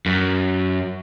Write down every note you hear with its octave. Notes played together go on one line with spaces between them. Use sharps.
F#2